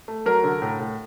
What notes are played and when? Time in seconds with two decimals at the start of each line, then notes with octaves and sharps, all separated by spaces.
0.08 A3
0.26 F#3 A#4
0.44 D3
0.62 A2
0.80 A2